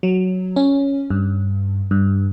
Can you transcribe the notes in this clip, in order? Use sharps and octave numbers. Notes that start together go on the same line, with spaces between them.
F#3
C#4
G2
G2